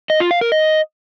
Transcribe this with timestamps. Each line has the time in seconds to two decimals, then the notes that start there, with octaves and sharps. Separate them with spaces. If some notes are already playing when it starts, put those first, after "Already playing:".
0.10 D#5
0.20 F4
0.31 F5
0.41 A#4
0.52 D#5